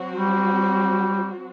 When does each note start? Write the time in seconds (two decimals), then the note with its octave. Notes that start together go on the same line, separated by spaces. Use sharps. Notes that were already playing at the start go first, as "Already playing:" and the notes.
Already playing: F#3 C4 F#4
0.14 G3